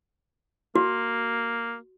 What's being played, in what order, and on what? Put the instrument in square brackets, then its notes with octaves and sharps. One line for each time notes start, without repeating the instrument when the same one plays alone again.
[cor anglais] A#3 [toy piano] F#4